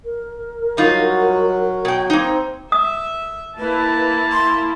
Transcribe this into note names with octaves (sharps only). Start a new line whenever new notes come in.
A#4
F#3 G3 D#4 F4 F#4
B2 G5
A#3 C4 D#4
E5 D#6
A#3 E4 B4 A5
C6